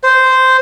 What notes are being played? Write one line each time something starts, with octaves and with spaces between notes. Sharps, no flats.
C5